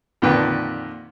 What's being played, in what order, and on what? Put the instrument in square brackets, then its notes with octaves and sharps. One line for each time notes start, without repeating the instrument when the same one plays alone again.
[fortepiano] F2 A#2 D3 D#3 B4 G5